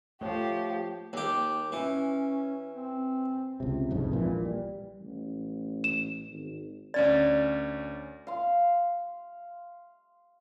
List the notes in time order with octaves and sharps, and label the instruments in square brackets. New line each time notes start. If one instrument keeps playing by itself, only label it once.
[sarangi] F3 [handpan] A3 C#5 [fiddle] G4
[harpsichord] D#2 G4
[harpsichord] E3 [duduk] C#4
[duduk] C4
[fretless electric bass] C#2 C3
C2 F2 G#2
A#1 A#2 E3
G3
[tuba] A1
[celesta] E7
[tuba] G#1
[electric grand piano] D2 C#4 A6 [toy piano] D5
[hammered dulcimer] F5 C6